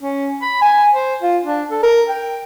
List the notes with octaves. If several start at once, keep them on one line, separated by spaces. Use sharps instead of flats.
C#4
B5
G#5
C5
F4
D4
A4
A#4
G5